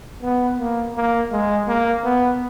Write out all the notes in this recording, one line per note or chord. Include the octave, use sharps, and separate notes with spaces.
B3
A#3
A#3
G#3
A#3
B3